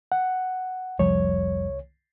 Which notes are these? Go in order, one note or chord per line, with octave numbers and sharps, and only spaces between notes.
F#5
F1 C2 F3 G3 C#5